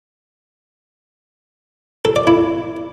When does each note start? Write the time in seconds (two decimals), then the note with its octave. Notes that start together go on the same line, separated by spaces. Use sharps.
2.05 A4
2.16 D5
2.27 E4